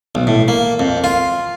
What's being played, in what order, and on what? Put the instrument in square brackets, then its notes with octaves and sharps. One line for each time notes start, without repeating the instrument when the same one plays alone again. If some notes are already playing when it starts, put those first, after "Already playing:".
[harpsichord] B1
A2
A#3
F2
F4